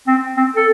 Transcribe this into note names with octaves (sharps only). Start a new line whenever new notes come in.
C4
C4
A4